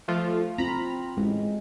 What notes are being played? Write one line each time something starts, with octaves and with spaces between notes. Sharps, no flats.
F3 A3 F4
C4 F4 A#5 B5
A1 G#3